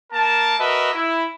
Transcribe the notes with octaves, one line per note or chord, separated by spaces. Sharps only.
A#3 A#4 A5
F#4 A#4 B4 D#5 E5
E4